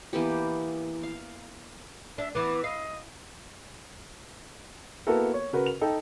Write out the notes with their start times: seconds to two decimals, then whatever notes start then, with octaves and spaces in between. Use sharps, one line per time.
0.13 E3 A#3 B3 G4
1.03 F5
2.18 D4 E5
2.35 E3 B3 D6
2.64 D#5 F5
5.07 A#3 B3 E4 F#4 A4 A#4
5.34 C#5
5.53 C#3 F#4 A#4 B4
5.66 F7
5.81 D#4 A4 G5